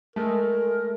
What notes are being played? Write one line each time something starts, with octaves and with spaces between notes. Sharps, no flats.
G#3 A3 A#4